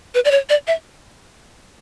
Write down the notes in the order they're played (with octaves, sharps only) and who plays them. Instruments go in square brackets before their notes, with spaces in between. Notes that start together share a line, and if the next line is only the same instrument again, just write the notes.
[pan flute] B4
D5
C#5
D5
E5